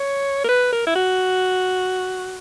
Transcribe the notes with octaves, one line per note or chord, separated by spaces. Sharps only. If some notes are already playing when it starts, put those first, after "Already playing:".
Already playing: C#5
A#4
B4
A#4
E4
F#4